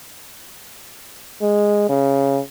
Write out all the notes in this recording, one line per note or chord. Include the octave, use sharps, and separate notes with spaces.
G#3
C#3